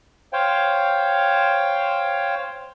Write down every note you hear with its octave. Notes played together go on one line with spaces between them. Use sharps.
C5 C#5 F5 G5